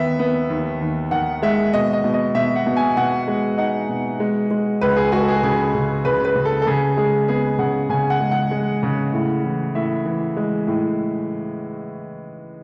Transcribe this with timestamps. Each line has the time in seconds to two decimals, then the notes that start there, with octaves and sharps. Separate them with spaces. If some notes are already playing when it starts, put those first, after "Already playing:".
Already playing: D#2 D#3 B3 E5
0.19 B3
0.49 D#2
0.80 D#2
1.11 D#3 F#5
1.42 G#3 E5
1.73 B2 D#5
1.93 D#5
2.04 B2
2.14 D#5
2.35 B2 E5
2.56 F#5
2.66 B2
2.76 G#5
2.97 B2 F#5
3.28 G#3
3.58 D#4 F#5
3.89 B2
4.20 G#3
4.51 G#3
4.81 C#2 B4
4.97 G#4
5.12 G#3 F#4
5.21 A4
5.28 G#4
5.43 C#3 G#4
5.75 C#3
6.05 C#3 B4
6.25 B4
6.36 C#3
6.45 A4
6.62 A4
6.67 C#3 G#4
6.97 G#3 G#4
7.28 B3 G#4
7.59 C#3 F#5
7.89 C#3 G#5
8.10 F#5
8.20 G#3
8.31 F#5
8.51 G#3
8.83 C#3
9.13 A2
9.44 E3
9.75 A2 E5
10.05 E3
10.37 G#3
10.67 A2